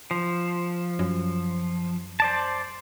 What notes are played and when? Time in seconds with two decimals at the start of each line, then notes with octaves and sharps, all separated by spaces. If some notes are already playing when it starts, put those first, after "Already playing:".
0.11 F3
0.99 F#2
2.20 C5 D5 A5